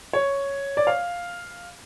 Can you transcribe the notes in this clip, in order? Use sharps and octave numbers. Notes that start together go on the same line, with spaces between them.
C#5
D5
F5